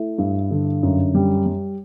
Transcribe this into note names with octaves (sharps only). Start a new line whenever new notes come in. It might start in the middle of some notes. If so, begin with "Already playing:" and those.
Already playing: A3 E4
G2
D3
F#2
G3
G3